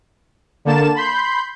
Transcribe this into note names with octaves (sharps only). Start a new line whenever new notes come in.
D3 A#3 A5 E7
B5 C6 G6